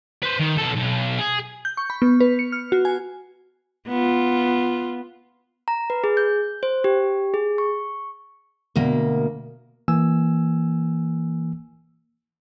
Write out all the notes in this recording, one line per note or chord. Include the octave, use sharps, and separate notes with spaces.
B4 C5
D#3
B2 A4
B1
G#4
G6
C#6
B5
B3
B4
C#7
F6
F#4
G#5
B3 F4
A#5
B4
G#4
G6
C5
G4
G#4
C#6
D2 B2 A#3
E3 A#3 G#5 E6